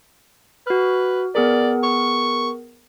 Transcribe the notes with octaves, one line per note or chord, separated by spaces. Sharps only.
F#4 B4 F6
B3 G#4 A#4 D5
C#6